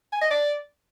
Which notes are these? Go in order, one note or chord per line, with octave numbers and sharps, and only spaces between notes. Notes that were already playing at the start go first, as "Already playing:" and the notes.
G#5
D#5
D5